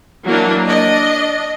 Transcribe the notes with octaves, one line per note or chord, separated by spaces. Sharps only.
E3 F#3 A#3 D4
D4 D#5